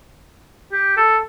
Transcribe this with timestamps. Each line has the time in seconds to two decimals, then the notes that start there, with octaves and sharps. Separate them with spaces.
0.72 G4
0.97 A4